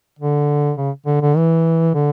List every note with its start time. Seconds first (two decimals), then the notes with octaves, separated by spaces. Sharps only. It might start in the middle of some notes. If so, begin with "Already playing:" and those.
0.19 D3
0.77 C#3
1.06 D3
1.21 D3
1.36 E3
1.94 D3